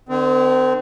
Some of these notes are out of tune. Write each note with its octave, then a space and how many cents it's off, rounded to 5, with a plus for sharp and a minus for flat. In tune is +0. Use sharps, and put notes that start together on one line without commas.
D3 +40 C4 -30